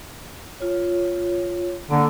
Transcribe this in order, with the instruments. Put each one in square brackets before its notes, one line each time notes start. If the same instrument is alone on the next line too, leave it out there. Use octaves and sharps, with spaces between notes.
[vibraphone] F4 C#5
[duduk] D3 [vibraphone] A#3